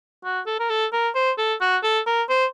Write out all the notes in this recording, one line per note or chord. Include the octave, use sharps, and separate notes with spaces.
F#4
A4
A#4
A4
A#4
C5
A4
F#4
A4
A#4
C5